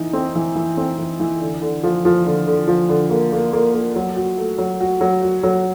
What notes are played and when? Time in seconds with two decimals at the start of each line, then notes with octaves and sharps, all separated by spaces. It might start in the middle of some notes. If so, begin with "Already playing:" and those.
Already playing: E3 D#4
0.13 C4
0.35 E3
0.55 E3
0.77 C4
0.99 E3
1.20 E3
1.40 D3
1.62 D3
1.83 F3
2.05 F3
2.26 D3
2.47 D3
2.68 F3
2.89 D3
3.10 A#3
3.32 A#3
3.53 A#3
3.74 A#3
3.96 F#3
4.16 F#4
4.37 A3
4.58 F#3
4.80 F#4
5.01 F#3
5.22 F#4
5.43 F#3